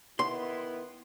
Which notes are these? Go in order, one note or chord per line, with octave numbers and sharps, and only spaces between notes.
D#3 B3 E4 C6